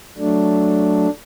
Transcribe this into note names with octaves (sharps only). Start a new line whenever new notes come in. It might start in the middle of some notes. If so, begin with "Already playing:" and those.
F#3 A3 D4